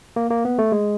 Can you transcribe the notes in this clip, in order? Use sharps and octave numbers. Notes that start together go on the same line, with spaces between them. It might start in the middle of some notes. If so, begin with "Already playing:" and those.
A#3
A#3
B3
A3
G#3